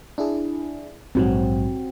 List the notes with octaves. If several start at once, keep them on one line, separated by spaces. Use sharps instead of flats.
D4 E4 G#4
A#1 G#2 F#3 C4 F#4